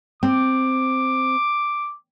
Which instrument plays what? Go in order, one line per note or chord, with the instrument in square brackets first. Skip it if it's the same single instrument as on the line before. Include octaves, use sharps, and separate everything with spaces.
[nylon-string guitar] C4 [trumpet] D6